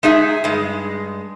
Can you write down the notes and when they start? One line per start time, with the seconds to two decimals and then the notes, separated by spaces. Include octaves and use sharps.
0.03 G#3 D#4 G#4 E5
0.44 G2 G#3